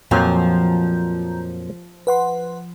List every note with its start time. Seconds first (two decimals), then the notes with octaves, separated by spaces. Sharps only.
0.11 F2 A#2 F3 F#3 A#5 G6
2.07 B4 F#5 C6